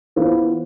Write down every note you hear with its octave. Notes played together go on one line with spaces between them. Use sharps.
E3 B3 F4 C5